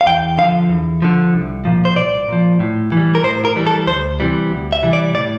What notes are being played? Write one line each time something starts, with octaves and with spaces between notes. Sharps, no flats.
F5
E2 G5
D3 F3 F5
E2
D3 F3
C2
A#2 F3
C5
C2 D5
A#2 F3
A2
E3 G3
A#4
A2 C5
A#4
E3 G3
A4
D2 C5
C3 E3 G3
D2
E5
C3 E3 G3
D5
A2 D5